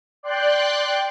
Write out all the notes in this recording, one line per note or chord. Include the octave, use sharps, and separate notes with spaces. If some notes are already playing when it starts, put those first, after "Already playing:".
D5 G5 C6 F#6